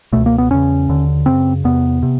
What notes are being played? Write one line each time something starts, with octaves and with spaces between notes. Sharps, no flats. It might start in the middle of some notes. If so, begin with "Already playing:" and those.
C#2 B2 A3
A#3
B3
E2 C#3 C#4
D#2 D3
F#2 C#3 C4
E2 C3 B3
C3